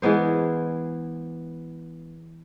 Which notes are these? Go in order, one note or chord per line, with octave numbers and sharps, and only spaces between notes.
E3 G#3 B3 C5